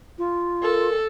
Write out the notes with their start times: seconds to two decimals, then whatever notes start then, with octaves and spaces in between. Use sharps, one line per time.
0.18 F4
0.62 A4 A#4